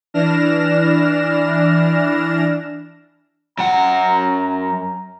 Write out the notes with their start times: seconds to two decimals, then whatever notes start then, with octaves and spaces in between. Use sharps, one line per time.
0.14 E3 D4 F6 A#6 E7
3.59 F#2 F#5 A#5